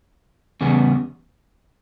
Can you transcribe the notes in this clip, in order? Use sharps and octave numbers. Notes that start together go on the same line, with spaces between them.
E2 C#3 G3 B3